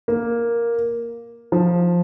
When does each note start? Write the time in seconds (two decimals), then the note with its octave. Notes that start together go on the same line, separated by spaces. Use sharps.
0.08 A#3
1.52 F3